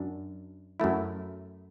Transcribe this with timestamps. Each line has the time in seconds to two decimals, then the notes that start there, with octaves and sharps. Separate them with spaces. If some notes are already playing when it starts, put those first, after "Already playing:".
Already playing: F#2 D4
0.80 F#2 F#3 A3 E4